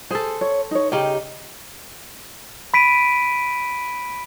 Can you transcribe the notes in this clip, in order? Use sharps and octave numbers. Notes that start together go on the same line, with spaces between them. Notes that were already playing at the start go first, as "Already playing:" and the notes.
G#4 A4 C5 G#5
C#5
D#4 C#5
C#3 D#4 G4 G5
B5 B6 D7 D#7